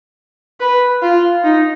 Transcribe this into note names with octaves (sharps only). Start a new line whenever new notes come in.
B4
F4
D#4